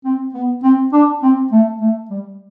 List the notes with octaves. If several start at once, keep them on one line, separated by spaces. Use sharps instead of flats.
C4
B3
C4
D4
C4
A3
A3
G3